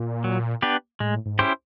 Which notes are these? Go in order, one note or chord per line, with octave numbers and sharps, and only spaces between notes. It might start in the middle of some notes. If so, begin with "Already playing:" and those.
Already playing: A#2
F#3
B3 D4 G4 B4
A2 G#3
G#2
C#4 E4 G4 C5